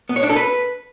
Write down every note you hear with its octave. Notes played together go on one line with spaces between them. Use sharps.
B3
C#5
D4
A4
B4